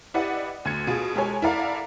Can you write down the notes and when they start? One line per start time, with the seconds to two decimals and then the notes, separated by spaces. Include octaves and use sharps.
0.14 E4 G4 B4 D5 D#5 F#5
0.65 D2 G#6 C#7
0.87 B2 F4 G#4
1.16 G#3 G4 A4 A#4 C#5 G#5
1.42 E4 A4 A#4 D5 F5 F#5